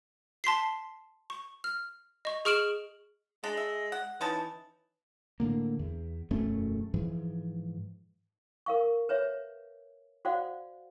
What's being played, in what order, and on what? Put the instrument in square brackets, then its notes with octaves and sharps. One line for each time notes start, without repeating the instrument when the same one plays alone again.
[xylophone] A5 C6 B6 C7
C#6
F6
D#5 C#6
G#4 C#6 F6 D7 E7 F#7
[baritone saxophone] G#3 [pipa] D4
[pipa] E5
F#5
[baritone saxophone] E3 [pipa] C#4 D#4 A5
[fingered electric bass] A2 D3 A#3
E2
E1 F#2 A3 C#4
G#2 E3 F3
[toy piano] A#4 F5 C#6
B4 C#5 E5
F#4 C5 D5 F5 F#5